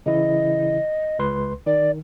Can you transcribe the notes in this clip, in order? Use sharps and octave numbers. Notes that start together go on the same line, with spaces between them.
C#3 E3 E4 D#5
C#2 B4 C6
D#3 D5